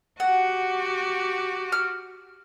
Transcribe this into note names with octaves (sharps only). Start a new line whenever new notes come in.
F#4 G4 F#5
F6